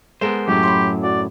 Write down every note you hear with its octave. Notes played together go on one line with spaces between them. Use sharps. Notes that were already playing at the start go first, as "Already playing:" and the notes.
G#3 B3 A4 A#4 C5 E7
F#2 A2 F#3 G4
B5 C6
F#4 D5